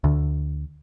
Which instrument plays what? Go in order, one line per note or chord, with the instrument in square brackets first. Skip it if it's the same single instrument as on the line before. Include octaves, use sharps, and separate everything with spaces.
[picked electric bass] D2 D3